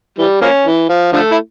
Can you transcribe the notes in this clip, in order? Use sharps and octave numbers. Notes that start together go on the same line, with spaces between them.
E3 G3
F3 A#3 C#4
E3
F3
D3 F3 A3
E4